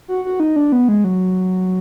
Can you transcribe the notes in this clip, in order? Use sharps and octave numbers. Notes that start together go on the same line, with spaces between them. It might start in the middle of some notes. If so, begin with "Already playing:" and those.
F#4
F#4
D#4
D4
B3
G#3
F#3